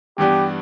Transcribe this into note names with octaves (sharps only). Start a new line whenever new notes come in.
G2 E3 G3 B3 D4 G4